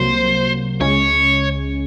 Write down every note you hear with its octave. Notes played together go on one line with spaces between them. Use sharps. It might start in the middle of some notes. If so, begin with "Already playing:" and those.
Already playing: C2 C3 F#3 A#3 C5
C#2 C#3 G#3 C#4 C#5